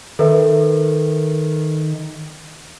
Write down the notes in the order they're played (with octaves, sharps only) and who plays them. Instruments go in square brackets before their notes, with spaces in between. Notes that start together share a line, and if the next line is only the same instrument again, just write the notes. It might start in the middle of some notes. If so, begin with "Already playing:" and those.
[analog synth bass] D#3 [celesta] A4 B4 E5